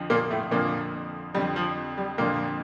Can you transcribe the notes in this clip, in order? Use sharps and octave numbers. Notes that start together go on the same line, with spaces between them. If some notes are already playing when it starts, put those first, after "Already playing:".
Already playing: F2 D3 F3
A#2 A#3
A2 A3
F2 A#2 D3 F3 A#3
F2 D3 F3 G3
F3
G3
F2 A#2 D3 F3 A#3